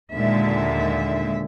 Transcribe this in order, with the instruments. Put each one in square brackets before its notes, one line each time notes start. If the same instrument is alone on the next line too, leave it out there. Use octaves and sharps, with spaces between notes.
[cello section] D#2 A#2 D3 G#3 E5